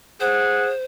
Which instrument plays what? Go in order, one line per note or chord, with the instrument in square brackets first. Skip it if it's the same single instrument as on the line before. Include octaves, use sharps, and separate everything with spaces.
[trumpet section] G#4 F#5 [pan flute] C5